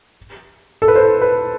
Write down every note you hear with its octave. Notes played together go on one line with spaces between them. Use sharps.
A4
B4
C5
B4